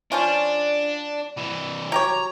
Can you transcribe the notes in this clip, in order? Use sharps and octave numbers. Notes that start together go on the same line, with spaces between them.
F3 C#4 D4 F4
C2 E3
F#3 G4 C#5 A#5